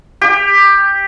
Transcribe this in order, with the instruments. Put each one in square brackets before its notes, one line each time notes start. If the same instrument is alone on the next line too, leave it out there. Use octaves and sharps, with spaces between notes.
[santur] G4